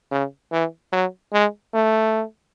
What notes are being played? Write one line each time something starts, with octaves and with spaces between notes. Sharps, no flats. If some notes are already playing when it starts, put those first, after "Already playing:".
C#3
E3
F#3
G#3
A3